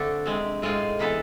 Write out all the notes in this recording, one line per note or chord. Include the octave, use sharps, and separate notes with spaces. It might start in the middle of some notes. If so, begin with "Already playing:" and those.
Already playing: D3 A3 C4 D4 A4
C3 G#3 C4
A2 G#3 C4 F4
C3 E3 B3 E4 A4